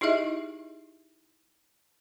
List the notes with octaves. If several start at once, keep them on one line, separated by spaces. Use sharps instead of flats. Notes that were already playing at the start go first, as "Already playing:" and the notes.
D#4 E4 G4 G#4 D#5 E5